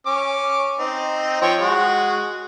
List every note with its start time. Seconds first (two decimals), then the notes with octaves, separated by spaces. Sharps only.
0.06 C#4 D6
0.79 C4 D#4
1.42 F3 C#5 G5
1.60 G#3 F#4